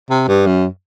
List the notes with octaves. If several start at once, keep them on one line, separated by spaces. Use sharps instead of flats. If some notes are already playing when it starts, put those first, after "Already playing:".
C3
G2
F#2